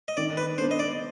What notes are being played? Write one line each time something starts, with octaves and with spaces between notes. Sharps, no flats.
D#5
D#3 D5
B4
B3 D4 C5
D#5
D5